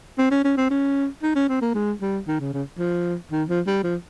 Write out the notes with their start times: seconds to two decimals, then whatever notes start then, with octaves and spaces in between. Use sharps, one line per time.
0.18 C4
0.31 C#4
0.44 C#4
0.57 C4
0.70 C#4
1.23 D#4
1.35 C#4
1.49 C4
1.61 A#3
1.74 G#3
2.01 G3
2.27 D#3
2.40 C#3
2.53 C#3
2.79 F3
3.31 D#3
3.49 F3
3.67 G3
3.84 F3